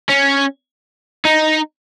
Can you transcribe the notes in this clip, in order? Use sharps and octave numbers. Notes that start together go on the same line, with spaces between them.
C#4
D#4